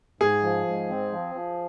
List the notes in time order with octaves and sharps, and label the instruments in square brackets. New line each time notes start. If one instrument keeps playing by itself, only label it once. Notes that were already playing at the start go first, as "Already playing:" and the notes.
[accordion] G#2 [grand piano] G#4
[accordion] F3
G#2
C4
F3
F3